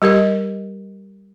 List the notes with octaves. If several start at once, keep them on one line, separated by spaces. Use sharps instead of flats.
G3 G4 A#4 D#5